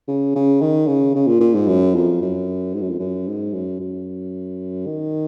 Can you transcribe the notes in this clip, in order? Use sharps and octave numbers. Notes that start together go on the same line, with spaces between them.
C#3
C#3
D#3
C#3
C#3
A#2
A#2
G#2
F#2
F2
F#2
G#2
F#2
F2
F#2
G#2
F#2
F#2
D#3